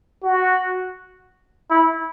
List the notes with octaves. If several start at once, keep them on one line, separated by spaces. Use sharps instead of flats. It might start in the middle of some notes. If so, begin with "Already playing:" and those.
F#4
E4